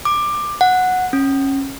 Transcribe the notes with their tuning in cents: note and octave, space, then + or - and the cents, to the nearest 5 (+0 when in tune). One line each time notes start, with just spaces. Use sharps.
D6 +15
F#5 -10
C#4 -20